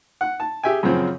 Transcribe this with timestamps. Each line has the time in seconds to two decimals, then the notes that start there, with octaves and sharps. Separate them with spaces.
0.21 F#5
0.40 A5
0.63 G4 G#4 E5 G5 G#5
0.83 F#2 C#3 F3 C4